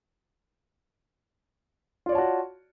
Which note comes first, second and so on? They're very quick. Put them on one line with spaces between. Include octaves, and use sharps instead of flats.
F4 D5 C#5 A5 F#4